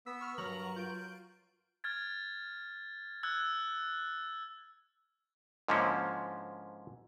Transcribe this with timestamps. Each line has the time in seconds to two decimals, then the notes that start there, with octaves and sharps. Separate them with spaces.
0.06 B3 E6 B6
0.21 C#6 F6
0.38 G2 F#3 A#4 A#5 C#6 F#7
0.76 F4 G6 D7
1.84 F6 G#6 A6
3.23 E6 F#6 G#6
5.68 G#2 D3 F3 A#3 C#4 E4